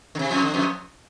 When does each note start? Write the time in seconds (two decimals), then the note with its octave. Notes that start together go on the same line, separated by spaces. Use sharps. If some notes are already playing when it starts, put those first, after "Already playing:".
0.15 D3
0.19 C3
0.30 F2 F3
0.42 D3
0.54 F2 F3